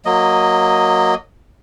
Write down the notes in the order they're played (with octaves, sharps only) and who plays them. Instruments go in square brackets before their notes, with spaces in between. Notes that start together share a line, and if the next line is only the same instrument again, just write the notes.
[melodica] F#3 A#3 D#5